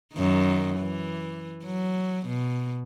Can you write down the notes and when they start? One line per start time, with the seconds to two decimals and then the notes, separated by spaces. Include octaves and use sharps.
0.15 F#2 D#3
0.78 E3
1.64 F#3
2.27 B2